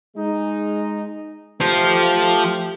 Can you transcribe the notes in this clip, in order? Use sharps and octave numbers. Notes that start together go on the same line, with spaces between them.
G#3 D#4
F3 A3 G4 C5